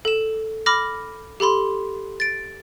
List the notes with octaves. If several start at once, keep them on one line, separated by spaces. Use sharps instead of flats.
A4 E7
B5 D6 F6 A#6
G4 A4 B5 C6
A6 D7